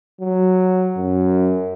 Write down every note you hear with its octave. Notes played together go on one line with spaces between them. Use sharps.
F#3
F#2